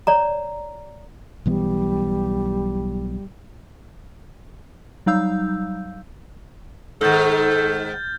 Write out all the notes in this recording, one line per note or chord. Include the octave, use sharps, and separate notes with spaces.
C#5 D5 A#5
B1 E3 G3 B3
F#3 G3 D#4 F5 E6 G6
G#2 D#3 A4 F6 G6 A6